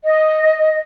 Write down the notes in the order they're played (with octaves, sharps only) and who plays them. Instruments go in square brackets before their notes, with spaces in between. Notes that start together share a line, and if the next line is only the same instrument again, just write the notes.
[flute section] D#5